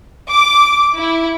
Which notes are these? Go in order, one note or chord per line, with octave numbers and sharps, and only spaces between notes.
D6
E4